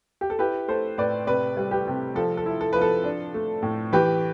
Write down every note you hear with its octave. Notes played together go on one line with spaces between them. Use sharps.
G4
A4
E4 G4 B4
A3 A4 C5
A2 B4 D5
C3 B4 D5
G3
G4 B4
C3
F3 A4
A4
E4
A4
F3 B4
A4
D4
A3
A2
E3 G4 B4